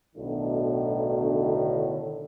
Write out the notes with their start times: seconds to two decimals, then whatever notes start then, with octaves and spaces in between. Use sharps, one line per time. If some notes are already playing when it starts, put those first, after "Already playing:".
0.16 B1 A2 D3 D#3